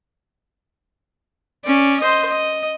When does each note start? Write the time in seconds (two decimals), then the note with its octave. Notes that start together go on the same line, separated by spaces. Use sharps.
1.65 C#4 D5
2.00 C5 D#5
2.30 D#5